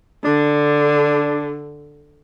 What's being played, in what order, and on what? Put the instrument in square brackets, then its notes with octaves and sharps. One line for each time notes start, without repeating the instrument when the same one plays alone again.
[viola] D3 [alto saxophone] D4